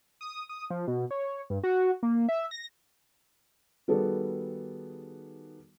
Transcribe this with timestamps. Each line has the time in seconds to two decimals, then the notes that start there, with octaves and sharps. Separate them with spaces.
0.21 D#6
0.49 D#6
0.70 F3
0.88 B2
1.11 C#5
1.50 G2
1.64 F#4
2.03 A#3
2.29 E5
2.51 A#6
3.88 D#3 G3 B3 F#4 G#4 A4